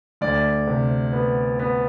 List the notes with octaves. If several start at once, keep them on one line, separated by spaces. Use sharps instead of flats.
D2 D5
C3
B3
B3